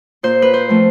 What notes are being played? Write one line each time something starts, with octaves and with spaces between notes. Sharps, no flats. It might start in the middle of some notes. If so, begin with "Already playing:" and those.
A#2 C5
B4
C5
F3 A3 C4